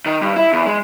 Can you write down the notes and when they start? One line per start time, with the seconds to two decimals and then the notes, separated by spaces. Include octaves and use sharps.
0.06 D#3
0.22 G2
0.36 E4
0.53 E2
0.66 G#3